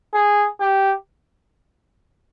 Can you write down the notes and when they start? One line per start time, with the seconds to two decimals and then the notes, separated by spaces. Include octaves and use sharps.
0.14 G#4
0.61 G4